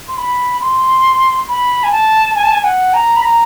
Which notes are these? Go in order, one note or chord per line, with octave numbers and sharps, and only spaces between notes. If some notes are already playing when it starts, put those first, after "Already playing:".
C6
B5
C6
B5
G#5
A5
G#5
A5
G#5
F#5
A#5
B5
A#5